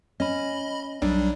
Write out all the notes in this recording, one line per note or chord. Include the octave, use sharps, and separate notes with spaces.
C#4 D#5 B5
B1 F#3 G3 D4